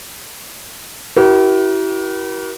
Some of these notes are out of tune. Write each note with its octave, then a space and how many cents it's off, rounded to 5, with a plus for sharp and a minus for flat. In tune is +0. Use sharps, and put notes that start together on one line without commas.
E4 +0 G4 -45 A#4 +35